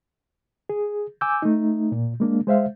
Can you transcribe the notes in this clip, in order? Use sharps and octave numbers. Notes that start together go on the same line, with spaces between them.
G#4
G#5 D6 E6 G6
A3 D#4
A#2
G#3 A#3 D4
G#3 C5 E5 F5